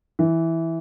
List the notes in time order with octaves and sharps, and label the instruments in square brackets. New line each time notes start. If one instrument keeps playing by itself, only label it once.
[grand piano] E3